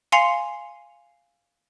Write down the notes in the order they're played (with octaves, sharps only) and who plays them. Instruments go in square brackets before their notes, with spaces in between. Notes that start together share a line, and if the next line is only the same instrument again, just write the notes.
[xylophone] F5 G#5 C6 C7 C#7 F7